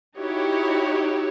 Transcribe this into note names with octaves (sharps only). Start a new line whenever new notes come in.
D#4 E4 F#4 G4 C#5